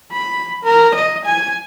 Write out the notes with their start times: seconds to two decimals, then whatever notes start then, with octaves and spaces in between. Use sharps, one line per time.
0.12 B5
0.64 A#4
0.95 D#5
1.25 G#5